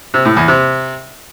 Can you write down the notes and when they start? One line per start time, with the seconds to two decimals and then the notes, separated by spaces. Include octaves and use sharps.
0.14 C3
0.25 A2
0.37 E2
0.48 C3